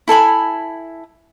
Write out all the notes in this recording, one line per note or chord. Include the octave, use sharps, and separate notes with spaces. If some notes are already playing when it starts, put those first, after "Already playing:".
E4 A4 G#5 B5